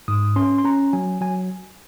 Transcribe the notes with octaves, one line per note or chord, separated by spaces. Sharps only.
G#2 D#6
C#4 C6
C6
C#4 A#5
F#3 G#5
F#3 G#5